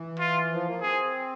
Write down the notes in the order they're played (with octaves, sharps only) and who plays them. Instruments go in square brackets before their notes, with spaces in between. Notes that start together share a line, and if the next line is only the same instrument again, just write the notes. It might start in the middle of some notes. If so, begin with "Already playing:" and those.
Already playing: [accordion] E3
[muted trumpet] F4
[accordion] F3
A#3
[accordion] C4 [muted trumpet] G#4